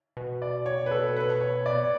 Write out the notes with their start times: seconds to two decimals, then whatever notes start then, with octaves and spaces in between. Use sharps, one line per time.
0.17 B2
0.42 D5
0.66 C#5
0.86 B4
0.91 A4
1.16 B4
1.41 C#5
1.66 D5